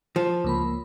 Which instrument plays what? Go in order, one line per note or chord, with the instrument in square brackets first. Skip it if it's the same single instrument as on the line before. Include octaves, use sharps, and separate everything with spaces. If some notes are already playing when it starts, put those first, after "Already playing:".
[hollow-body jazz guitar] F3
[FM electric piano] C#2 A#3 B5